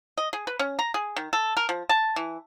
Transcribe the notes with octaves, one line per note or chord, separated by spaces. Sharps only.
D#5
G#4
B4
C#4
A#5
G#4
D#3
A4
A#4
F3
A5
E3